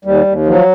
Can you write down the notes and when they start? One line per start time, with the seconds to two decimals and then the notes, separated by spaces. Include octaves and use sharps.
0.05 D#2 G3
0.26 D#2
0.46 F3 F#3